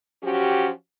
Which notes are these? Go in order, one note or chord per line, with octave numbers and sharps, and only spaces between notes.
F3 F#3 C#4 F#4 G4